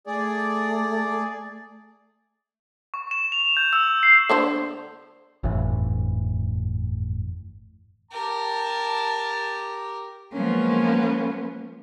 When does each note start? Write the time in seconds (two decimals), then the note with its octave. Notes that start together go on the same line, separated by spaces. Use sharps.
0.07 A3 G#4 D5
2.94 C#6
3.11 E7
3.32 F7
3.57 G6
3.73 E6
4.03 C7
4.30 D3 D4 C5
5.43 G1 F2 A2 E3
8.12 G4 A#4 A5
10.33 F3 F#3 G#3 A#3 B3 C#4